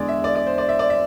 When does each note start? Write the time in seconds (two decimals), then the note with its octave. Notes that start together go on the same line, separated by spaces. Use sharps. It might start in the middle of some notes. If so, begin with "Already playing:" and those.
Already playing: E2 D3 G#3 D5
0.08 E5
0.24 D5
0.35 D5
0.46 C5
0.58 D5
0.69 E5
0.79 D5
0.90 E5